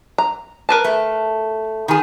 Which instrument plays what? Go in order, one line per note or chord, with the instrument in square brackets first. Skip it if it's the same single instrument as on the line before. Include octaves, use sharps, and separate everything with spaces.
[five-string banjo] A#5
A#4 B4 A5
[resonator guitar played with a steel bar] A3
D#3 G#4